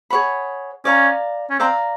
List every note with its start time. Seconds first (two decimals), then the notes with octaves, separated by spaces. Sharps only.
0.10 G#4 C#5 F#5 B5
0.85 C#4 D5 F5 A#5
1.50 C#4
1.59 C4 D5 F5 A#5